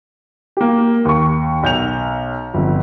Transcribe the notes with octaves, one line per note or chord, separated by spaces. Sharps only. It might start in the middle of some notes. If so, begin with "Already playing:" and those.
A#3 G4
D#2 C#6
B1 G6 F7
G1 F2